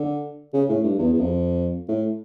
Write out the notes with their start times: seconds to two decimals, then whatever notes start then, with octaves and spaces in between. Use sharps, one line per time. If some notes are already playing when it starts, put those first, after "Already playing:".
Already playing: D3
0.53 C#3
0.69 A2
0.84 G2
0.98 E2
1.14 E2
1.21 F2
1.89 A2